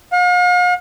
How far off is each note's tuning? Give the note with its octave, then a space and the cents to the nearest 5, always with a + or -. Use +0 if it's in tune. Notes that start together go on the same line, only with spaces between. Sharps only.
F5 +45